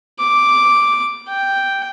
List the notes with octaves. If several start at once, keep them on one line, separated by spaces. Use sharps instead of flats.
D6
G5